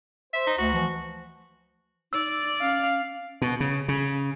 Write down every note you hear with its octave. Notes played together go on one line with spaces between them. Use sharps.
C5 E5
D#4
D2 F#4
E3 F3
D#4 D5 E6
C#4 F5
B2
C#3
C#3